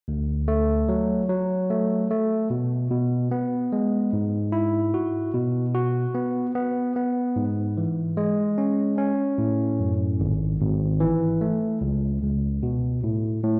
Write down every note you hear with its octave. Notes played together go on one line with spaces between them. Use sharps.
D2
A3
F#3
F#3
A3
A3
B2
B2
B3
G#3
G#2
E4
F#4
B2
F#4
B3
B3
B3
G#2
E3
G#3
C#4
C#4
A2
F#2
G#1
G#1
E3
A3
C#2
C#2
B2
A2
A2